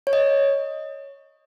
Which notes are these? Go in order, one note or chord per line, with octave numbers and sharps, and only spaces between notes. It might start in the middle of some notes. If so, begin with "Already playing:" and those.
C#5
D#5